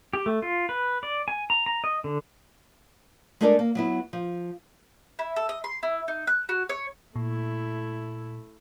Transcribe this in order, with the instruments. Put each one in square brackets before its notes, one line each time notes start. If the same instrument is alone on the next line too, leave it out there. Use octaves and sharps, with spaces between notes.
[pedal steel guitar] G4
A3
F4
B4
D5
G#5
A#5
A#5
D#5
D3
[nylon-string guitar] G#3 A3 D4 A4 A#4 D5
A#3
F#3 B3 E4
F3
[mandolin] E4
A4
D#5
C6
E4
D#4
F#6
F#4
C#5
[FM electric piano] A#2 [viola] A3 E4